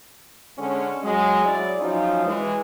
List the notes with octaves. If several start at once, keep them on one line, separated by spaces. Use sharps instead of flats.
D3 G#3 C#4
F#3 G#3
F#3 C#4 E4 G#4 D5
F3 F#3 C#4 D#4 F4
E3 G#3